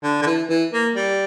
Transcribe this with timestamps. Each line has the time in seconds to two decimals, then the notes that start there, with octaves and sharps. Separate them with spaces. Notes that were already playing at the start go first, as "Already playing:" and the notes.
0.03 D3
0.22 D3
0.26 E3
0.49 E3
0.73 A#3
0.95 G3